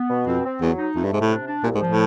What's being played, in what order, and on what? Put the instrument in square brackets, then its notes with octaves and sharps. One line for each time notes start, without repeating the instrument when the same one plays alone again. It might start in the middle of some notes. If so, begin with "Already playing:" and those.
Already playing: [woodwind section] B3
B2
[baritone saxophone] F2 [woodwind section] C4
[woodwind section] C4
[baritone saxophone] E2 [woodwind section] F#3
[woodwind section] D#4
[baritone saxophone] F2 [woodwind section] A3
[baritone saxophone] G2
[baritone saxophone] G#2 [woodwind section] C3
[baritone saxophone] A2
[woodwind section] D4
D4
[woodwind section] C2 [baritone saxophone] A#2
[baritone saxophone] G#2
[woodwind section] F3
[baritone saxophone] A2